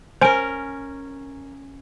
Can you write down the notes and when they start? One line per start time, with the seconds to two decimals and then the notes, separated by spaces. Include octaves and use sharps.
0.21 C#4 A#4 C5 G#5 D7